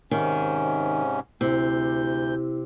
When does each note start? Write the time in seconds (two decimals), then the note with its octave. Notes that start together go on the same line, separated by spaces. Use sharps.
0.11 G#2 C3 D#3 C#4
1.41 D2 C3 E4 G6